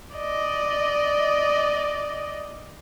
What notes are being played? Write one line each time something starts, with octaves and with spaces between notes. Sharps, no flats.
D5 D#5